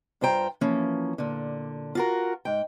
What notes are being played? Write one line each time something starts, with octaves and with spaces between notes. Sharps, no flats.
G2 F4 C5 G5 A#5
E3 F3 A#3 C#4
A#2 D3
F4 F#4 A#4
G#2 G5